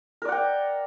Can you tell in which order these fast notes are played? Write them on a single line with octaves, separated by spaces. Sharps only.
A#4 D5 F#5 G5